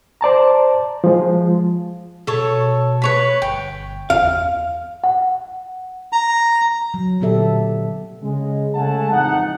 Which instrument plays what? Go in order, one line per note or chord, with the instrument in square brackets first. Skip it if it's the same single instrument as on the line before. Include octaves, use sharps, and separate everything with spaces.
[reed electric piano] C5 D5 A5 A#5
F3 G#3
[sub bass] B2 [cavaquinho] A4 C#5
[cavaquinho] B4 C#5 B5
[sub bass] G1 [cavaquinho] G5
[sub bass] E2 [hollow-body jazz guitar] F5
[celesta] F#5
[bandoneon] A#5
[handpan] F#3
A#2 D3 B3 G4 A4 E5
[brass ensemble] C#3 G#3
C#3 G#3 A3 F#5 G#5 A5
A1 F2 D#4 F#5